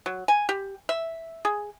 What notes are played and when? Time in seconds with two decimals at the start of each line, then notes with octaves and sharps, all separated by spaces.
0.06 F#3
0.28 G#5
0.49 G4
0.89 E5
1.45 G#4